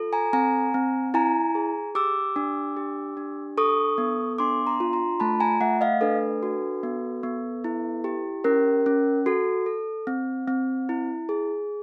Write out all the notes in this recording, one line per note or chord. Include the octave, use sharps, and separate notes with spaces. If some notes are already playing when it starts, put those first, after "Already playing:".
Already playing: F4 A4
G#5 A#5
C4 G#5 A#5
C4
E4 G#5 A#5
G#4
G4 D6 E6
D4
G4
D4
A4 C#6 D#6
B3
D4 C6 D6
A#5 C6
F4
A#5 C6
A3 A5 B5
G#5 A#5
A3 E5 F#5
D#5 F5
D4 A4 B4
F#4
B3
B3
E4
G4
C#4 A#4
C#4
F#4 A4
A4
C4
C4
E4
G#4